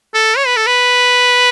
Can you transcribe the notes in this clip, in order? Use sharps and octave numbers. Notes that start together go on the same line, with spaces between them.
A4
C#5
B4
A4
B4